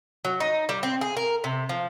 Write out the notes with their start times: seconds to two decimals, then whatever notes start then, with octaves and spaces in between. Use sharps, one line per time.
0.25 F#3
0.40 D#4
0.69 G3
0.83 C4
1.01 G#4
1.17 A#4
1.44 C3
1.69 F3